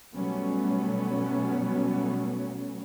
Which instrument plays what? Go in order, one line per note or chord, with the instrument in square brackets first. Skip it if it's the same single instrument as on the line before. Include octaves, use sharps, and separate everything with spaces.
[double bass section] B2 F#3 G3 A3 B3 C#4